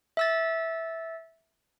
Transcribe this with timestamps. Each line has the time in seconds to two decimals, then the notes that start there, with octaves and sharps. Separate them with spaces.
0.17 E5 E6 A6